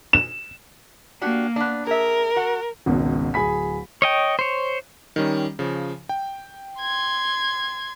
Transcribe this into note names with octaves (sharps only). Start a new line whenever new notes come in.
E7
A#3 D4 F#4 G4
B3 D4
G#4 A#4 E5
F#4 F#5
G#1 C#2 B2
D1 G#4 G#5 B5 B6
C#5 D#5 G5
C5 C#5
D#3 G3 C#4
C#3 F3
G5
C6 G#6